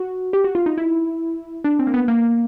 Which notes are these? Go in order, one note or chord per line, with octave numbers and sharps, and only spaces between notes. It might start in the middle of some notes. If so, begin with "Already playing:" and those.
Already playing: F#4
G4
F#4
F4
D#4
E4
D4
C4
A#3
B3
A#3